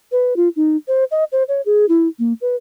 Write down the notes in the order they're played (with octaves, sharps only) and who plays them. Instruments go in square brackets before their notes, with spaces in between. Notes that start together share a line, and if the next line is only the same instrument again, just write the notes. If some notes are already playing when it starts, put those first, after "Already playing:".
[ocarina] B4
F4
D#4
C5
D#5
C5
C#5
G#4
E4
A#3
B4